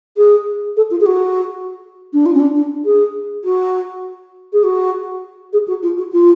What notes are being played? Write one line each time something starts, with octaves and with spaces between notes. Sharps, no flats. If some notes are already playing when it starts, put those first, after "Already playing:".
G#4
A4
F4
G#4
F#4
D4
F4
C#4
D4
D4
G#4
F#4
G#4
F#4
G#4
F#4
F4
F#4
F4